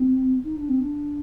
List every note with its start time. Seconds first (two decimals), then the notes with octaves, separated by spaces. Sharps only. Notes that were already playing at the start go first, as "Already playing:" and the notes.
Already playing: C4
0.43 D#4
0.56 D4
0.68 C4
0.80 D4